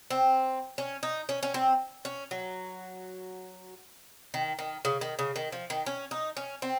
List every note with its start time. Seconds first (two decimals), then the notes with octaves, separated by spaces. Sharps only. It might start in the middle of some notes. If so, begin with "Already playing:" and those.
0.10 C4
0.78 C#4
1.03 D#4
1.29 C#4
1.43 C#4
1.54 C4
2.05 C#4
2.31 F#3
4.34 D#3
4.59 D#3
4.85 C#3
5.01 D#3
5.19 C#3
5.36 D#3
5.52 F3
5.70 D#3
5.86 C#4
6.11 D#4
6.37 C#4
6.62 C4